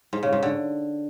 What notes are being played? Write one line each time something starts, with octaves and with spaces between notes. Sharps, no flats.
G#2
C#3
G#2
D3